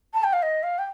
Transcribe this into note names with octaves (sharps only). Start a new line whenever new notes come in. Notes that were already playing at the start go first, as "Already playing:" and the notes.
A5
G5
F5
D#5
F5
G5